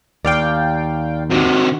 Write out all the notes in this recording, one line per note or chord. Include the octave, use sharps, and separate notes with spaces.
D#2 D5 F5 G5
C3 D#3 F#4